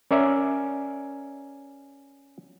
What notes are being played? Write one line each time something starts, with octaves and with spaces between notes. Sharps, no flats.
C#4 A#4 D5 E5